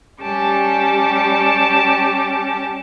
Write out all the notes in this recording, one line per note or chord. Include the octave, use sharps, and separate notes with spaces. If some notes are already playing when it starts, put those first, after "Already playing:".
G3 C#4 G4 A5 D6